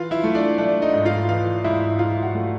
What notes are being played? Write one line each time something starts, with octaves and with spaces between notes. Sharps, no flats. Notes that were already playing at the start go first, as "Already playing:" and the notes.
Already playing: E3 F4 F5
E4 E5
A3
D4 D5
A3 D4 D5
D#4 D#5
G#2
F4 F5
E3 F4 F5
G#2 E4 E5
G#2 F4 F5
F#4 F#5
A3